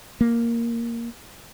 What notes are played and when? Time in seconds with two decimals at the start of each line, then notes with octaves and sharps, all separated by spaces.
0.21 A#3